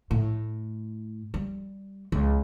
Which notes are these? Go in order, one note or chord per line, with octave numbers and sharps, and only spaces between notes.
A2
G3
C#2